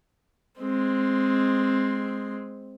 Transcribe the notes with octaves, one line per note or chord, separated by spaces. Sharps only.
G#3 C4